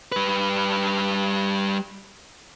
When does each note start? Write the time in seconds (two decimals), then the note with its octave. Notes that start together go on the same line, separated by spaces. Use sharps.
0.12 G3 B4